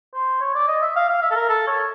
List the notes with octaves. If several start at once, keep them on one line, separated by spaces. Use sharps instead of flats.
C5
C#5
D5
D#5
E5
F5
F5
E5
A4
A#4
A4
C#5